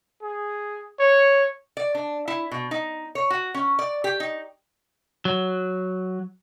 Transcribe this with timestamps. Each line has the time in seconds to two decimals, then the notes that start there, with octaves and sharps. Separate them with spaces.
0.23 G#4
0.99 C#5
1.77 D5
1.95 D4
2.28 E4
2.51 B2
2.71 D#4
3.15 C#5
3.30 F#4
3.54 C#4
3.79 D5
4.04 G4
4.20 D#4
5.25 F#3